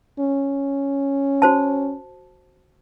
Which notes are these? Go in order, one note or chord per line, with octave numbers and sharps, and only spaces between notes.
C#4
F#4 C5 A5